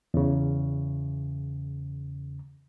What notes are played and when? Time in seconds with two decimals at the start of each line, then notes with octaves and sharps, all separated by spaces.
0.14 E2 C#3